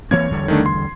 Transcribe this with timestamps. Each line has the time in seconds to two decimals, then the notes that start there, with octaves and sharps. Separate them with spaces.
0.11 E3 A#3 C4 C#5 G#6
0.30 E2 D3 G3
0.48 D#3 A3 D4
0.66 C6